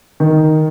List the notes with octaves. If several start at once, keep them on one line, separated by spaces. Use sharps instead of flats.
D#3